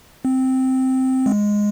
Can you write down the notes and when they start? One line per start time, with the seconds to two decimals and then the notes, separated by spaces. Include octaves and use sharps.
0.25 C4
1.26 G#3